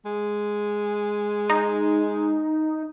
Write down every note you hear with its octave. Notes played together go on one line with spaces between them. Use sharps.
G#3
D#4